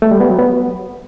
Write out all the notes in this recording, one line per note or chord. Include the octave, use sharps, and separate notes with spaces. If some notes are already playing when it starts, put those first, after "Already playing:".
A3
G3
B3
F#3
B3